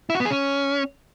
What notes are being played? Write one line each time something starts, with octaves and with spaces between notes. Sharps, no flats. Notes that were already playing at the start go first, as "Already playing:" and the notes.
E4
F#4
B3
G#4
C#4